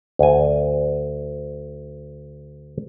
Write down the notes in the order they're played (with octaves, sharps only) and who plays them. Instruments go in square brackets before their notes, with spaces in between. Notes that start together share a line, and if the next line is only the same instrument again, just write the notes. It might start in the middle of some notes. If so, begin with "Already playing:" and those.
[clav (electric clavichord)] D2 G#5